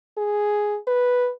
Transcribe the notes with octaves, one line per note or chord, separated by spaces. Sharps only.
G#4
B4